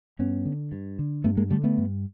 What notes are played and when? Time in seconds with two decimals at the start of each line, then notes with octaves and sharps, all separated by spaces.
0.19 G2 B3 C#4
0.45 D3
0.72 G2
0.99 D3
1.24 G2 A3 B3
1.37 G#3 A#3
1.50 D3 G3 A3
1.64 A3 B3
1.78 G2